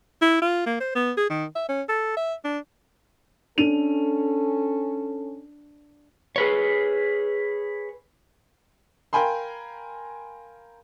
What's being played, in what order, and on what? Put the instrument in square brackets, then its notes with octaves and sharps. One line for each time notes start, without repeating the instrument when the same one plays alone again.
[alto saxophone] E4
F4
A#3
C5
B3
G#4
D#3
E5
C#4
A4
E5
D4
[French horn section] C#4 A4 [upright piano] D4 D#7 F7
[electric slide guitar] G#4 B4 C#5
[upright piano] A#4 F5 G5 G#5 B5 C6